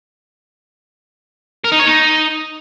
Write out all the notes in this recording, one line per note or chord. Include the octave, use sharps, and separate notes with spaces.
A#4
D#4
C#5
D#4